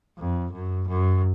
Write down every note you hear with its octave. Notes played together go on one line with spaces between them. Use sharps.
F2
F#2
F#2